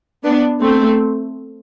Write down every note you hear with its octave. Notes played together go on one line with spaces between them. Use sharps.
B3 D4
A3 C4